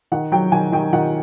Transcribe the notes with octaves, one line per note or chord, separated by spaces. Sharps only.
D#3 F#5
F#3 G5
D#3 G#5
D#3 G5
D#3 F#5